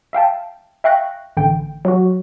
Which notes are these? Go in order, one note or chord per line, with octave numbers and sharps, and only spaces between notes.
E5 F5 G5 A5
E5 F5 G5 C#6 F#6 A#6
A1 D3 G5
F#3 F#4